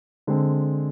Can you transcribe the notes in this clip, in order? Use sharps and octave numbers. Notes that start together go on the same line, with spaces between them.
D3 G#3 C4